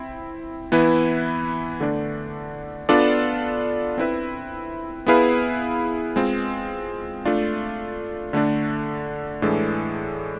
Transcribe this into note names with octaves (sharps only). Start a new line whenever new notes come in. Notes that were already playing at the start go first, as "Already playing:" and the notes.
Already playing: C4 E4
E3 B3 E4 B4
D3 A3 D4
B3 D4 F4 A4 D5
C4 E4 B4 E5
B3 E4 G#4 B4 F5
G#3 C4 F4
A3 D4 F4
D3 A3 D4
A2 E3 G#3 D4 A4